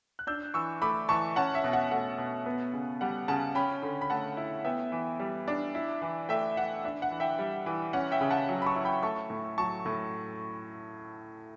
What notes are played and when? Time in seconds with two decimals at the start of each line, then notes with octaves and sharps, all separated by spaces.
0.19 F#6
0.27 D4 E6 G6
0.54 E3 C#6 E6
0.82 A3 B5 D6
1.09 E3 A5 C#6
1.36 C#4 F#5 A5
1.55 E5
1.64 B2
1.73 F#5
1.91 A3 F#5
2.18 B2
2.46 B3
2.73 C#3
3.01 G3 F#5
3.28 C#3 F#5 A5
3.55 C#4 G5 B5
3.82 D3
4.01 B5
4.10 A3 F#5 A5
4.37 E4
4.65 B3 E5 G5
4.92 E3
5.20 G3
5.48 D4
5.75 E4
6.02 E3
6.29 A3 E5 G5
6.56 E3 F#5
6.85 D4 E5
7.02 F#5
7.11 E3
7.20 E5 G5
7.39 G3
7.66 E3
7.93 C#4 F#5
8.12 E5 G5
8.21 C#3
8.31 F#5 A5
8.49 F#3
8.62 B5
8.66 A5 C#6
8.76 E4
8.85 G5 B5
9.03 A3 A5 C#6
9.30 A2
9.58 F#3 A5 C#6
9.86 A2